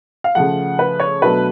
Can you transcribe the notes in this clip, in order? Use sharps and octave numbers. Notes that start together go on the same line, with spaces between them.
F5
C#3 F3 A3 F#5
B4
C#5
B2 F#3 A3 D4 B4